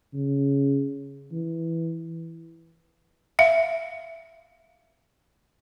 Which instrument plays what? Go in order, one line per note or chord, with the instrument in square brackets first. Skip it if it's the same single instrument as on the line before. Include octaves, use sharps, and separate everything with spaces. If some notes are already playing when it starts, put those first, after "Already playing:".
[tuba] C#3
E3
[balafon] E5 F5